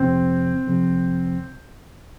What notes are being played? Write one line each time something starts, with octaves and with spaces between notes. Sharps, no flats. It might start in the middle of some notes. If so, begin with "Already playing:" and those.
Already playing: F1 F2 C3 C4
F1 F2 C3